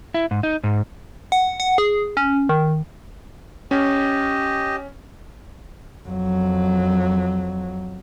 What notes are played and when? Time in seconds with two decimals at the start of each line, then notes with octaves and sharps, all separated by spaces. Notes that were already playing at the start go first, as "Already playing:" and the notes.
0.14 E4
0.31 G#2
0.43 D#4
0.64 G#2
1.32 F#5
1.60 F#5
1.78 G#4
2.17 C#4
2.49 D#3
3.71 C#4 G4 D#5
6.07 F2 F#3